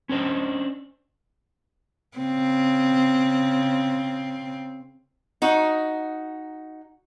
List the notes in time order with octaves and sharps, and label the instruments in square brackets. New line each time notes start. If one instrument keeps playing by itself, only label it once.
[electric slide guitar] C#4 D4 C5 D#5
[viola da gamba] C#3 C4
[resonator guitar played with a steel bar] D#4 F#4